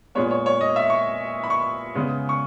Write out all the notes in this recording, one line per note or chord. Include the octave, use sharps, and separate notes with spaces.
A#2 G#3 B3 C#5
C#5
C#5
D#5
E5
C#6
B5
C#6
C#3 G#3 B3
C#6